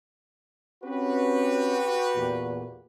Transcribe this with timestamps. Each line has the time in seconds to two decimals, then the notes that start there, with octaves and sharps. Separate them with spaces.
0.84 C4 C#4 F#4 G4 B4
2.15 E2 A#2